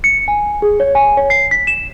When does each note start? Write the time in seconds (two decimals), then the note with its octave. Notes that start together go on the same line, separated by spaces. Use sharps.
0.04 C#7
0.28 G#5
0.62 G#4
0.80 C#5
0.95 G#5
1.17 C#5
1.30 C7
1.51 B6
1.67 E7